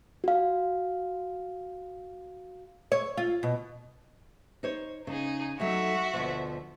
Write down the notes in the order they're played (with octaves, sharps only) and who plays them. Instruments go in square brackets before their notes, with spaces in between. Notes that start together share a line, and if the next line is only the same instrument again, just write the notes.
[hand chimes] F#4 F5
[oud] C#5
F4
B2
[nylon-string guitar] D#4 C5 C#5
[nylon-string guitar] C#3 [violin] D#4 G#4
[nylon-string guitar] F#3 A3 D#4 [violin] F#4 E5
[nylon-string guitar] D2 B2 F3